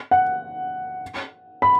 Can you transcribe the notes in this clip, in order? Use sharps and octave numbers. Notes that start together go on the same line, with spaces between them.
F#5
B5